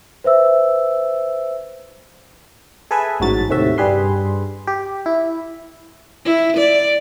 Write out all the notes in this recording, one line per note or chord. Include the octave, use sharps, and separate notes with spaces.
B4 C5 E5 E6
G#4 A4 B4 E5 G#5
A1 G#2 F#3 A6
D#2 A2 C3 F#4 E5
G2 G3 G#4 B4 C6
G4
E4
E4
D5